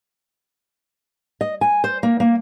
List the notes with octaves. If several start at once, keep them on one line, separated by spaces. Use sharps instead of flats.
D#5
G#5
C5
A#3
A#3